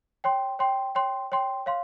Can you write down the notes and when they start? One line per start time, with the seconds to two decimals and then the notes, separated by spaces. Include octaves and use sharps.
0.24 C#5 G5 C6
0.59 C#5 G5 C6
0.95 C#5 G5 C6
1.32 C#5 G5 C6
1.66 C#5 F5 C6